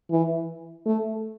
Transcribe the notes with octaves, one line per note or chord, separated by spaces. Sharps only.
E3
A3